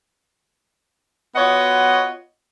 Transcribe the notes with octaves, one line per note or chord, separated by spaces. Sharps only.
B3 F4 F#4 C#5 D#5 F#5